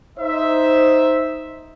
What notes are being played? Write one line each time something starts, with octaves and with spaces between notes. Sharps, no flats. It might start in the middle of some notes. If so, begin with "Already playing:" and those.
D#4 C5 E5